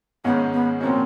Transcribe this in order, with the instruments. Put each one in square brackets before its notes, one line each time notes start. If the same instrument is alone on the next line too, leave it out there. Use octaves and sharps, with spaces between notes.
[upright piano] G#2 D#3 G#3 C#4 [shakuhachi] B3
[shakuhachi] B3
[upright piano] A#2 F3 A#3 C#4 F#4 [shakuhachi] C4